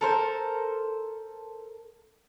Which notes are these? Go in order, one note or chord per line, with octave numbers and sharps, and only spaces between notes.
A4 A#4 C5